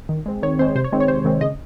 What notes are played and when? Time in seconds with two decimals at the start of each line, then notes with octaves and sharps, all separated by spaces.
0.09 D#3
0.26 G#3 C4
0.43 D#3 C#5
0.59 G#3 C4 C5
0.75 C3 C5
0.84 C#5
0.92 D#3 G#3 C4
1.00 C#5
1.08 C3 C5
1.25 D#3 G#3 C4
1.41 C#3 D#5